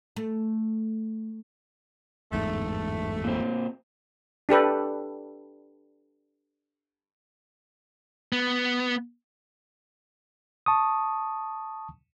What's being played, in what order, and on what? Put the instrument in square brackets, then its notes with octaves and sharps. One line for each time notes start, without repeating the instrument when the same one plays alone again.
[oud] A3
[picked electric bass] G1 E2 G#2 [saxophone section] A3
[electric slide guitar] A#2 C4
[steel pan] D4 G4 A4 B4
[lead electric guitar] B3
[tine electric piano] A5 C#6 D#6